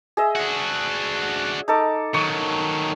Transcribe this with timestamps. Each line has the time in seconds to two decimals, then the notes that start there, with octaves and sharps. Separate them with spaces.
0.17 G#4 D#5 E5
0.36 D4 F#4
1.68 D#4 A4 D6
2.14 D#3 F#3 C#6